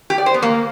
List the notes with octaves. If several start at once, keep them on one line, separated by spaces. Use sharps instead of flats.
G4
D5
C5
B3
A#3